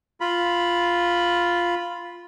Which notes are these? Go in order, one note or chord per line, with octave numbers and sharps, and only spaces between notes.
F4 B5